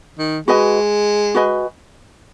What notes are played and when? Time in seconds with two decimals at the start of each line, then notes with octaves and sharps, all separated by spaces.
0.19 D#3
0.48 G#3 F#4 B4 D#5 G#5
1.35 F#4 B4 D#5 G#5